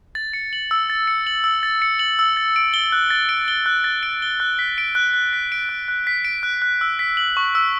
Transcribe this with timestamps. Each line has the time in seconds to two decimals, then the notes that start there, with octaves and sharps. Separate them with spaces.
0.15 A6
0.33 C#7
0.53 F#7
0.71 E6
0.90 A6
1.07 C#7
1.27 F#7
1.44 E6
1.63 A6
1.82 C#7
1.99 F#7
2.19 E6
2.37 A6
2.56 D7
2.74 G7
2.92 F#6
3.10 A6
3.29 D7
3.48 G7
3.66 F#6
3.84 A6
4.03 D7
4.22 G7
4.40 F#6
4.59 B6
4.78 D7
4.95 F#6
5.14 F#6
5.33 B6
5.52 D7
5.69 F#6
5.88 F#6
6.07 B6
6.25 D7
6.43 F#6
6.62 F#6
6.81 E6
6.99 B6
7.17 F#7
7.37 C#6
7.55 E6